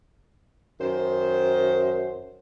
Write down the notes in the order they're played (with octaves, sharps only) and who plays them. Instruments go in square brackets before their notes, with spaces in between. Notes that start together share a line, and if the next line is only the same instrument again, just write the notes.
[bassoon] F#2 [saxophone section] D#3 C5